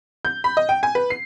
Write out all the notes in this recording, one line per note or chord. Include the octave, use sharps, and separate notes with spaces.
G6
B5
D#5
G5
G#5
B4
C7